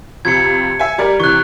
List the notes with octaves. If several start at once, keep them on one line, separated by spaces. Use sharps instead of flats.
F2 C3 G#6 C#7
E5 G#5
G3 A#4 D5
C3 E3 C#6 F#6